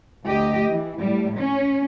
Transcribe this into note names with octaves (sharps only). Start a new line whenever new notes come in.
D2 G4 D#5
E3
A2 G3
C#4